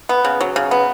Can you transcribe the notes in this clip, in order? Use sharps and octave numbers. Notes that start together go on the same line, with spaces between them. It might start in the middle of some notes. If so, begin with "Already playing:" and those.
B3
C#3
F#3
C#3
B3